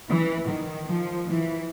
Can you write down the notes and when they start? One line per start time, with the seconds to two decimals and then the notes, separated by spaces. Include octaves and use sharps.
0.09 E3
0.48 D#3
0.87 F3
1.26 E3